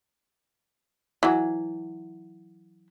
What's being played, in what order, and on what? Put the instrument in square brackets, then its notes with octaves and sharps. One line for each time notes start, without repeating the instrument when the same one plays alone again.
[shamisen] E3 F#3